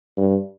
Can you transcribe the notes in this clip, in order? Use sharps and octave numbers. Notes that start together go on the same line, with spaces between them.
G2